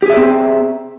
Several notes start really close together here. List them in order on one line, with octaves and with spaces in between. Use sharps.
G4 G#4 E5 D5 C4